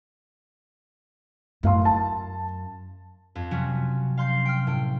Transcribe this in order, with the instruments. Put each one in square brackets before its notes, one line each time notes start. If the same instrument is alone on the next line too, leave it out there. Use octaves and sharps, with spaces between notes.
[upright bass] F#2 [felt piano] A2 F5 C6
[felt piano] A5
[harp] F2
C3 F3 F#3 C#4 F#4
F5 C6 G6 C7
G5 F6
A2 G5